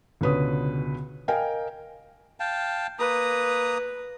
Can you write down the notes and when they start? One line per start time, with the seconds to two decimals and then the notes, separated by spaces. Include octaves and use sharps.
0.21 C#2 B2 D3 B4 C#5 D#6
1.28 A#4 D#5 F5 G5 G#5
2.40 F5 G5 A5
2.99 A#3 B4 A#5 D#6